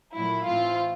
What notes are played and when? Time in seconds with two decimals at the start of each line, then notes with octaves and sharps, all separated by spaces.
0.15 A#2 F#3 A3 E4
0.46 A2 E3 A3 C4 F4